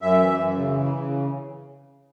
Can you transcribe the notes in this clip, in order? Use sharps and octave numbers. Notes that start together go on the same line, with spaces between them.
F#2 E5
E3
F#2
C#3
E3
C#3